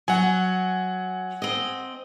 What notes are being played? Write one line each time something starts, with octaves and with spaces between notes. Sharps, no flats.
F#3 F#5 G#5
C4 D#5